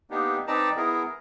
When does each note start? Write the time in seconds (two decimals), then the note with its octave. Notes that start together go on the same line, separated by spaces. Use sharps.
0.10 A#3 B3 D4 D#4 G4
0.47 C4 D#4 B4 D5 A5 A#5
0.76 B3 E4 G#4 A#4